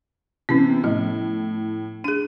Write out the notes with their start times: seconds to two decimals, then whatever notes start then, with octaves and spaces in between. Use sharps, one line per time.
0.49 C3 E3 B3 C#4
0.84 A2 F3 D#5
2.04 D4 G#4 D#7